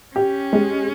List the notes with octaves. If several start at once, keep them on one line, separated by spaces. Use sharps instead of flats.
C#4 G4
G#3